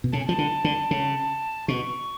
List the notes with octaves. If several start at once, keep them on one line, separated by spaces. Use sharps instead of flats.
B2
C#3 A5
G#5
F3 A5
D3
D3
C#3
B2 C#6